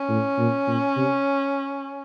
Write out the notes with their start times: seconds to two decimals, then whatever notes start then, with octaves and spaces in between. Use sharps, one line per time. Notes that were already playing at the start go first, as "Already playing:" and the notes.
Already playing: C#4
0.08 A2
0.38 A#2
0.67 A#2
0.96 C3